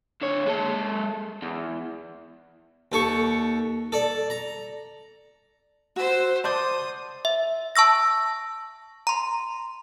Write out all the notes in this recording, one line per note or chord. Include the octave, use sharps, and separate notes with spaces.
D3 C#5
G#3 A4
E2
D#2 A4 C#6
A4 D5
A#5
F#4 C5 E6
C5 D5 A5 C6 D6 D#6
E5
A5 C#6 E6 A#6
A#5 C6